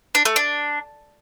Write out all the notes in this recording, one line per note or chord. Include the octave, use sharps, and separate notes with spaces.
D4
A3
D4